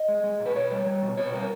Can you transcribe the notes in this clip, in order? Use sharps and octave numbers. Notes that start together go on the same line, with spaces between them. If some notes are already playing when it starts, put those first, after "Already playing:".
Already playing: D#5
G#3
G#3
A#2
B4
B2 C#5
G3
G3
B2
B2 C#5
G3 A#4